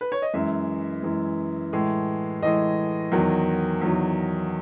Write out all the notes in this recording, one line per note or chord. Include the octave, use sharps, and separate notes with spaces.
B4
C#5
D#5
F#2 E3 G#3 E5
F#2 E3 G#3
A2 E3 G#3
A2 E3 G#3 D#5
E2 D#3 F#3
E2 D#3 F#3